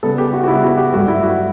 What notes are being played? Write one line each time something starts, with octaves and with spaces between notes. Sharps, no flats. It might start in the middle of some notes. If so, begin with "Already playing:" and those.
C#3 G3 B3 A4
G4
F#4
F#4
C#3 G3 B3 E4
F#4
G4
G2 F#3 A3 F#4
E4
F#4